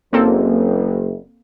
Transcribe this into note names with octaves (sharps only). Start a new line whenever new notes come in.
F#1 A#3 C4 A4